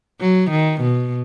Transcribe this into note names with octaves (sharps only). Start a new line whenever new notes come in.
F#3
D#3
B2